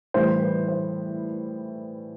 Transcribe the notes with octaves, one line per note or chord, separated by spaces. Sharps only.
A2 E3 G3 C5
B4
C5